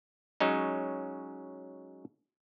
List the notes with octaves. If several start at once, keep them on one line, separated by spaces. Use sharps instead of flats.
F#3 G#3 C#4 D#4